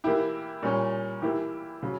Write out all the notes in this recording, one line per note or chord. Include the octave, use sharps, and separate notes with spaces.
E3 A#3 E4 G4
A#2 G3 C#4
E3 A#3 E4 G4
C#3 F#3